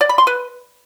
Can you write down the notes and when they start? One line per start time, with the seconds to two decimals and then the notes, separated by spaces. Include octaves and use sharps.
0.01 D5
0.09 B5
0.18 C6
0.27 B4